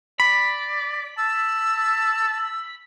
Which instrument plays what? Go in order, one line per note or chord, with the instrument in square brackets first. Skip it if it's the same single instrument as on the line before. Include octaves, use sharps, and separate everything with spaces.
[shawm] D5 [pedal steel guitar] B5
[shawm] A5 [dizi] E6